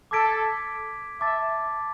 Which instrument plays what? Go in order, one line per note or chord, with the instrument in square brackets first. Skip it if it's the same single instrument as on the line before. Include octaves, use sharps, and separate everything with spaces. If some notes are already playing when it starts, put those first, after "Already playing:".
[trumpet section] A4 [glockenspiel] D6 G#6 B6 D7
[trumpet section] E5 [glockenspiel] A5 D6 A6